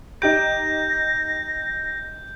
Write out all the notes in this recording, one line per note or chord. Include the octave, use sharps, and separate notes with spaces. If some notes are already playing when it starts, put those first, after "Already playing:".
D#4 G4 G6 A#6 D7